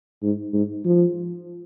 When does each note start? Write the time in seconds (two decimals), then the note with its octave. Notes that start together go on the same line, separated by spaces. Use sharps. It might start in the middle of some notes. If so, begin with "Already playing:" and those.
0.23 G#2
0.53 G#2
0.85 F3